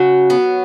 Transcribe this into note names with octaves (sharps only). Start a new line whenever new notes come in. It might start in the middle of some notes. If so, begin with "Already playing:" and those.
Already playing: C#3 F#3
B3